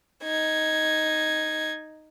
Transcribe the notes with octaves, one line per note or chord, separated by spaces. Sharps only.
D#4 G#6